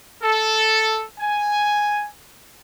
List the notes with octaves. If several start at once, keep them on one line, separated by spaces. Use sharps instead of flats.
A4
G#5